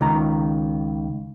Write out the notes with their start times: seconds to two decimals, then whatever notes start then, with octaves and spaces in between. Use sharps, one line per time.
0.01 C#2 D#3 A#5